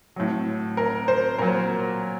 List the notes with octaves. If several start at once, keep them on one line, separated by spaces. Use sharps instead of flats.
A2 F#3
A#4
C5
A#2 F#3 A#4